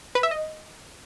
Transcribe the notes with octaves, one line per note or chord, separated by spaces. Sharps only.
B4
E5
D#5